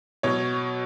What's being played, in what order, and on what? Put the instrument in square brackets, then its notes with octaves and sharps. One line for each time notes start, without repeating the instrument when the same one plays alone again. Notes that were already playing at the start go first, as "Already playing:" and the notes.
[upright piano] B2 F#3 C#5